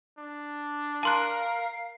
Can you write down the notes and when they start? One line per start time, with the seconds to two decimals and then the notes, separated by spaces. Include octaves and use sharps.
0.18 D4
1.03 A#4 F5 A5 C6 F#6